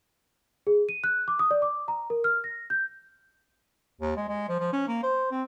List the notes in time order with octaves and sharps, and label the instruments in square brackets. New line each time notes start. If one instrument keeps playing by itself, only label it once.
[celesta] G#4
D#7
F#6
D6
D#6
D5
D6
A#5
A#4
F6
A#6
G6
[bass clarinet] D#2
G#3
G#3
F3
F3
C#4
A#3
C5
C4